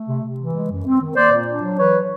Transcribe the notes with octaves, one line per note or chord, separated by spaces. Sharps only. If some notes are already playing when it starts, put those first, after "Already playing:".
Already playing: A3
C3
C3
E3
G#3
F#2
C4
D#3
A#3 C5 D5
A#2
D4
F#3
E3 B4 C#5